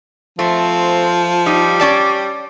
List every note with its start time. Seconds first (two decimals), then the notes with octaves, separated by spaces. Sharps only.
0.39 F3 A3 C4
1.46 G3 D#4
1.80 C#4 D5 A5